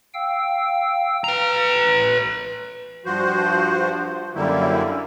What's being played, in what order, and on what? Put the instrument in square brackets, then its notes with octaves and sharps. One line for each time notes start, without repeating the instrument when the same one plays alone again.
[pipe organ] F5 G5 E6
[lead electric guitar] B4 A#5
[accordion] G2 F3 F#4 C5
F#2 D3 G3 A#3 E4